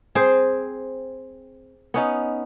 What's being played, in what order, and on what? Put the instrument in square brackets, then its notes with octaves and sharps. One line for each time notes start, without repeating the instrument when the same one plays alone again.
[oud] C4 [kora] G#4 C5
[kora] B3 C#4 D#4